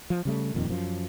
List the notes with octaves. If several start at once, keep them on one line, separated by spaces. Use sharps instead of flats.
F3
C#3 G3 A3
D#1 F2 A#2 D#3
F#2 F3